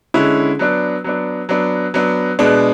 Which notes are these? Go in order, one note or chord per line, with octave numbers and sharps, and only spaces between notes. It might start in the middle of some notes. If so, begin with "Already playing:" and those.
D3 G#3 C#4 E4
F#3 B3 D4
F#3 B3 D4
F#3 B3 D4
F#3 B3 D4
B2 G#3 B3 D4